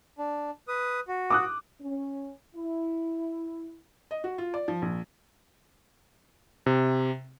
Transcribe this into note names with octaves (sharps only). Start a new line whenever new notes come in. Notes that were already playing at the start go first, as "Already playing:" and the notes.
D4
B4 D#6
F#4
D6 D#6 F#6
C#4
E4
D#5
F#4
F4
D5
F3
A#1
C3